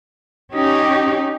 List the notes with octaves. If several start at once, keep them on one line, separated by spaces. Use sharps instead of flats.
C#4 D#4 G4